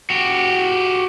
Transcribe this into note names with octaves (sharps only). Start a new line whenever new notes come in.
F#4 G4